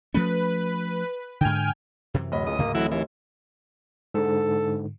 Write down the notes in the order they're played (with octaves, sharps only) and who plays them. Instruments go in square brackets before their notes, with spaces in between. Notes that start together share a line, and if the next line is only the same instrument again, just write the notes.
[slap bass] F3 A3 C#4 [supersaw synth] B4
[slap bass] G#2 D3 [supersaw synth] G5 G#5 F6
[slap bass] F#2 C3 E3
[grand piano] D1 D#5 B5 [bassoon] F#3
[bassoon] C#2 [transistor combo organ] D#6
[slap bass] G#2 C#3 [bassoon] A#3
[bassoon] A2 [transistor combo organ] E3 F#3 E4 [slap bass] A3 C4
[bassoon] D#2 [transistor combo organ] E3
[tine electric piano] G#2 D3 [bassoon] A4